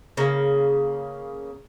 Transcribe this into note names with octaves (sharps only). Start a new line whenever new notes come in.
C#3 A#3